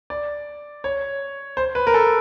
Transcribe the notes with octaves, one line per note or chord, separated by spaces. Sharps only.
D5
C#5
C5
B4
A#4
A4